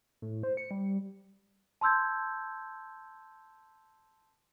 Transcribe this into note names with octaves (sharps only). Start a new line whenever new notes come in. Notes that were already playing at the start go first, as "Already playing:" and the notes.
A2
C5
C#7
G3
A5 C6 E6 G6 G#6